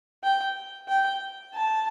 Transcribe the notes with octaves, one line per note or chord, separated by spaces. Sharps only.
G5
G5
A5